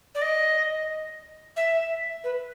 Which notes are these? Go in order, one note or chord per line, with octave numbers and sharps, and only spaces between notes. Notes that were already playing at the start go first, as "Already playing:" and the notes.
D5
D#5
E5
B4